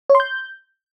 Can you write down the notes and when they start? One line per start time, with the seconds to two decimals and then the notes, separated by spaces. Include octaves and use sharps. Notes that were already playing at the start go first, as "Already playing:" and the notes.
0.10 C#5
0.15 C6
0.20 G6